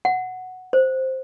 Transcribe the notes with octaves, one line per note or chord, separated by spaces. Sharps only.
F#5
C5